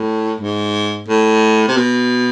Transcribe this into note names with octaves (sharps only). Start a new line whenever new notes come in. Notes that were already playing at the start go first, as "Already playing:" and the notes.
Already playing: A2
G#2
A2
C3
B2